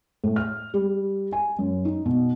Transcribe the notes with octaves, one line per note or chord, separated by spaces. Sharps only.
A2
F6
G3
G#5
F#2
D#4
B2